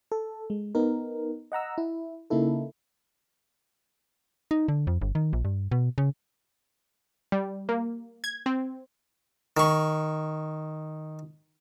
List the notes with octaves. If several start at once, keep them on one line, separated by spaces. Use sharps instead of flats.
A4
G#3
B3 D#4 A#4
D#5 F#5 A#5 E6
E4
C#3 A#3 D#4 E4 A4
D#4
D3
F2
G1
D#3
A#1
G2
B2
C#3
G3
A#3
G#6
C4
D#3 C#6